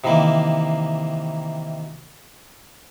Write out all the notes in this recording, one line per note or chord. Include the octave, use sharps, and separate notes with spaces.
C3 D#3 E3 A#3